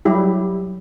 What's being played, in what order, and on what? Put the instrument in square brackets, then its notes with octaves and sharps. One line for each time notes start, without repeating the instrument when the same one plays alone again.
[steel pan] F#3 G3 E4 G4